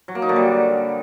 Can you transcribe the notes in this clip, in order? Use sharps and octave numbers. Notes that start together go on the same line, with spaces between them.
F#3
A#3
D#4
D3
G3